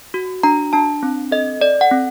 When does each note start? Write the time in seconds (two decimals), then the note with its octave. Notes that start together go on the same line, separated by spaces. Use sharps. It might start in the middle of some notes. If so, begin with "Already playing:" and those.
0.14 F#4
0.43 D4 A#5
0.73 D4 A5
1.03 C4
1.31 A4 D#5
1.61 A4 D5
1.81 F#5
1.91 C4